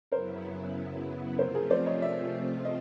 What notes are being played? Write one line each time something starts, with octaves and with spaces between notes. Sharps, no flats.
F#2 C#3 F#3 B3 E4 A#4 C5
C3 F3 A3 C4 F4 A#4 C5
G#4 A#4
C5 D5
C#5 D#5
D5 E5
D#5